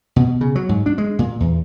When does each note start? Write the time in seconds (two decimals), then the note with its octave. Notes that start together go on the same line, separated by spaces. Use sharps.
0.16 B2
0.41 C#3
0.55 F#3
0.69 G#2
0.86 D4
0.98 G#3
1.19 A#2
1.40 E2